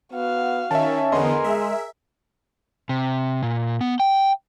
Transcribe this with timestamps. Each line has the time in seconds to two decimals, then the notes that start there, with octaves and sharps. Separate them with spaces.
0.13 B3 F#4 F5
0.71 D#3 C#4 E5 A5
1.12 E2 D3 B3 G#4 A#4 D#5 C6
1.44 G#3 E5
2.89 C3
3.43 A#2
3.81 B3
4.00 G5